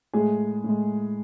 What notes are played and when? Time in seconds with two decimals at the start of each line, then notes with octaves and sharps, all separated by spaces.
0.13 A2 G#3 G#4
0.64 A2 G#3